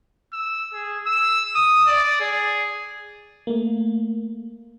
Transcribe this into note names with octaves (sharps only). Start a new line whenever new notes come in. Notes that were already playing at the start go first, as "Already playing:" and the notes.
E6
G#4
E6
D#6
D5
G#4
A3 A#3